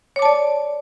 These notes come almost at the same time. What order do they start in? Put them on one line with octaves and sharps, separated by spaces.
C#5 D6 A5 D5